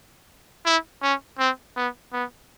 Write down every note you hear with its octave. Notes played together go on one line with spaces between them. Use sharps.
E4
C#4
C4
B3
B3